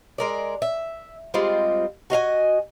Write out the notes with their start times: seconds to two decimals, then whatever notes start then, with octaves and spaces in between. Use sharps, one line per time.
0.18 G#3 A#4 D5
0.62 E5
1.34 G3 G#3 C4 F4
2.10 F#4 D#5 F5 G#5